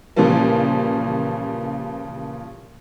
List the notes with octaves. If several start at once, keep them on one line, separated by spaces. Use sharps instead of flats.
A#2 C#3 E3 F3 G3 A#3